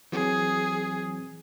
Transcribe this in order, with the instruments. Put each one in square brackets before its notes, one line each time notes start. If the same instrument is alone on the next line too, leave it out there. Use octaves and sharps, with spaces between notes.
[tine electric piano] E3 F#3 C4 [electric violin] G#4